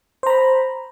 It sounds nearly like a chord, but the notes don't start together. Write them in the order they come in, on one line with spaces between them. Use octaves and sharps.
C5 A#5 B5